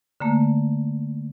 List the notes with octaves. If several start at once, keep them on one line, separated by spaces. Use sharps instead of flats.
D3 A3 A#3